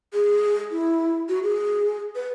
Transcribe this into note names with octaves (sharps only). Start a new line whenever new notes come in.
G#4
E4
F#4
G#4
B4